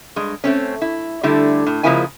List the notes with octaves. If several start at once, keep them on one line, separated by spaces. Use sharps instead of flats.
G2 G#3
A3 C4 C#4
E4
D3 G3 A3 E4
A2
C#3 F3 G#3 A#3 E4 G#5